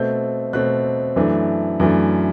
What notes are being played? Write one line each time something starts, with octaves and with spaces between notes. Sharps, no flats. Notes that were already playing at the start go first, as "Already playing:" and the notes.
Already playing: B2 A3 C4 G6
B2 A3 C4 F#6
F#2 E3 A3 D4
F#2 E3 A3 D4